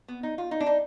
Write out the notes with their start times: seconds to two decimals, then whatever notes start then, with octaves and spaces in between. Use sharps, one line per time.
0.08 B3
0.23 D#4
0.38 F4
0.51 D#4
0.60 D4
0.66 D#4